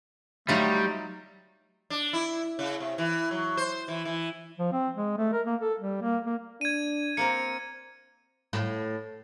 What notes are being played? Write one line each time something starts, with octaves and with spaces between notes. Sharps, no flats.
F#3 G3 A3 D#4 F4
D4
E4
C#3
C3
E3
F#3
C5
E3
E3
F3
C4
G#3
A3
A#4
A#3
A4
G3
A#3
A#3
D4 G#6 D#7
A#3 C4 A#4 C#7
A2